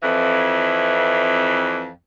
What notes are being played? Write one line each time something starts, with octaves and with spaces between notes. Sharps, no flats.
F2 E3